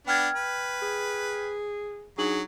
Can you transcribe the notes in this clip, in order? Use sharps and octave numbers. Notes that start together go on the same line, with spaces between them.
B3 D4 G5 F6 G#6
B4
G#4
F#3 D4 D#4 G#4 F#7